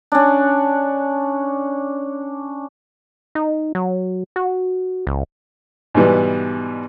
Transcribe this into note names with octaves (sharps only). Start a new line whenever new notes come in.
C#4 D4
D#4
F#3
F#4
C#2
G#2 B2 E3 G3 B3